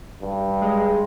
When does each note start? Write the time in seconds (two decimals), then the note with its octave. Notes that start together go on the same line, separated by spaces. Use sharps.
0.22 G2
0.62 G#3